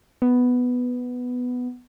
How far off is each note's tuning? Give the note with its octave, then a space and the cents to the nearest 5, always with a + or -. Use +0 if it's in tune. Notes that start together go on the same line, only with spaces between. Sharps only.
B3 +5